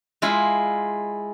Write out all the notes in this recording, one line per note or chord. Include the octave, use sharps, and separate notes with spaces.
G#3 E4 F4